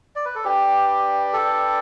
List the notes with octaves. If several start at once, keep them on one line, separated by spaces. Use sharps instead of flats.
D5
B4
A4
D4 G4 B4 D5 G5
A4